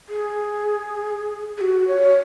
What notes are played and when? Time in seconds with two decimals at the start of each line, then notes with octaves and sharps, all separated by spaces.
0.09 G#4
1.57 G#4
1.61 F#4
1.88 C#5